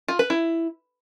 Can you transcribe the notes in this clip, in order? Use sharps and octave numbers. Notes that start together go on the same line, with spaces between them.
F4
B4
E4